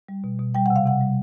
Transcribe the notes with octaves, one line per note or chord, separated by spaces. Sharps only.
G3
B2
B2
G3 G5
C3 F#5
F5
C3 F#5
G3